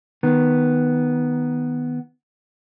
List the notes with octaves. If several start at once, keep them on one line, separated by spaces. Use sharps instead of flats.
D#3 B3